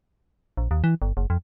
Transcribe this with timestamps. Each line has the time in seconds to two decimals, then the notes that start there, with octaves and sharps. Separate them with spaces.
0.57 A#1
0.71 D#2
0.84 E3
1.02 G1
1.17 F#1
1.30 F2